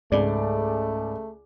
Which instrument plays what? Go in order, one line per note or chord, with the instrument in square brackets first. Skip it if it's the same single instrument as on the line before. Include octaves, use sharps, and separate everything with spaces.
[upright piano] C#2 D5 [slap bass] G#2 [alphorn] A3